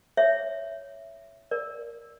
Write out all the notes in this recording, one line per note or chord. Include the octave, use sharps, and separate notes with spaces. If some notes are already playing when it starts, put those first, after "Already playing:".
C#5 E5
A#4 D5